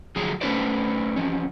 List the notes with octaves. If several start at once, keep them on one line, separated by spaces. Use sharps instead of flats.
D3 F3 F#3 F4 G#4
A3 C#4 D4 B4 C5 D5
E3 F3 C#4